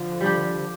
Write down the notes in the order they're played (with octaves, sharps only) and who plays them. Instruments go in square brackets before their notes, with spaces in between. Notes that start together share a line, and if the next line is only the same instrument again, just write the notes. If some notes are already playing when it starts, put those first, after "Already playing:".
Already playing: [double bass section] D3 F3
[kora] G3 D4 G4